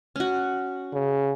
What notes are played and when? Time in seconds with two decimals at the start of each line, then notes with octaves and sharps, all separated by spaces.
0.16 C#4 F#4
0.93 C#3